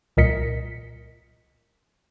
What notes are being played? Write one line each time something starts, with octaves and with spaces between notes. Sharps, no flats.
C2 A#2 A#4 D#5 B6 C#7